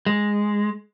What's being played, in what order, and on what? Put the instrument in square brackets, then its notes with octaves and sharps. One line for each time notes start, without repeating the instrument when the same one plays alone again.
[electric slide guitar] G#3